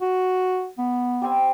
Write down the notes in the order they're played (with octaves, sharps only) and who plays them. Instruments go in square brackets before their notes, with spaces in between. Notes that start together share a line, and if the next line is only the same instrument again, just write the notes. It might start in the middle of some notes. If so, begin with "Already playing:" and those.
[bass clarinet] F#4
B3
[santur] G3 C4 G#5